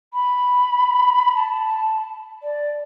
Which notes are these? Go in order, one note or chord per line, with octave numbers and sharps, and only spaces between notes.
B5
A5
D5